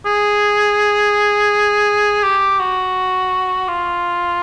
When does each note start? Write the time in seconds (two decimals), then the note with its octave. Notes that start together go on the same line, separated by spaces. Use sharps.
0.06 G#4
2.23 G4
2.59 F#4
3.68 F4